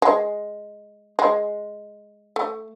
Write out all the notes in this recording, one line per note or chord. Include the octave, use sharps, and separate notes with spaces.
G#3
G#3
A3